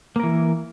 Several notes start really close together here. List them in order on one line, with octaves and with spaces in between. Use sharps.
A#3 A#4 E3